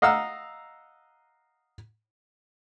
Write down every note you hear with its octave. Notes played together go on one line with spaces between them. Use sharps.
D#5 F5 F#5 A#5 E6